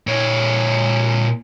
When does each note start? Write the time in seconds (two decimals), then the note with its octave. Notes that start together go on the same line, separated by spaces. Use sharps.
0.07 A#2 C#5